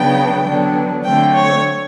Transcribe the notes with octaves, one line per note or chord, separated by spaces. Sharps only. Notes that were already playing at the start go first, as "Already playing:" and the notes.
Already playing: C#3 F#3 B3 D4 G5
D3 F#3 B3 D4
D3 F#3 A3 C4 G5
C#5